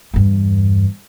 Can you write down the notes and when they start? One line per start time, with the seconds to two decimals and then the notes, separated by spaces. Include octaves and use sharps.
0.14 E2 G2